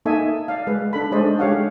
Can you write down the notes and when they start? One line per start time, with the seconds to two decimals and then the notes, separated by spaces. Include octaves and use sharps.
0.06 A#3 D#4 A4 D#5 E5 G#5
0.48 D5 F5
0.67 G#3 B4
0.93 D4 A4 B5
1.12 G#3 A3 D4 C5 D5 D#5
1.39 G#3 G4 C#5 F5 F#5